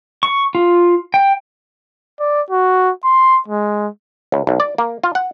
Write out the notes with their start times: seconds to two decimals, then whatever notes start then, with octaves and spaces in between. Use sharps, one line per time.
0.23 C#6
0.55 F4
1.14 G5
2.20 D5
2.51 F#4
3.04 C6
3.48 G#3
4.32 C#2
4.47 B1
4.60 D5
4.78 A#3
5.04 F4
5.15 F#5